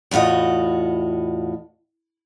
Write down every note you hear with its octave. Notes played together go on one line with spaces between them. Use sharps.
E2 A2 F4 F#4 D#5